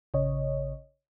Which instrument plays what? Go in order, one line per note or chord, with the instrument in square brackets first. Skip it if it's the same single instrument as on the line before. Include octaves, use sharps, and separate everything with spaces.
[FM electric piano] A1 C#3 C#5 D#5